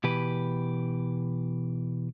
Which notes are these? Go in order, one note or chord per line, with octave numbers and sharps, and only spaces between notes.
B2 E3 G4 B4